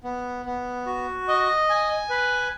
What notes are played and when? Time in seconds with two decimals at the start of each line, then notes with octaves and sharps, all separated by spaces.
0.04 B3
0.46 B3
0.86 F#4
1.28 D#5
1.69 G#5
2.10 B4